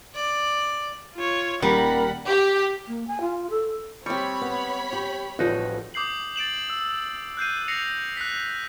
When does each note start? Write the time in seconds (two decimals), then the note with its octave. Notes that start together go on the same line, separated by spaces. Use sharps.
0.15 D5
1.15 F4 C#5
1.62 D#1 G3 A#4 F#5 B5
2.27 G4
2.88 A#3
3.07 G#5
3.20 F4
3.50 A4
4.06 G3 C4 C#5 B5 C#6
4.42 B3
4.93 G4
5.39 A1 F2 F3 G3 D#4 F#4
5.94 D6 D#6 G6 C7 F#7
6.36 A6 D7 E7 F#7
6.70 E6
7.37 F#6 G6 C7 D#7
7.68 A#6 C7 C#7 F7
8.17 F#6 B6